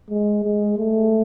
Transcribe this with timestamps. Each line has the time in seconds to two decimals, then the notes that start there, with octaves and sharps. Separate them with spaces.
0.10 G#3
0.44 G#3
0.78 A3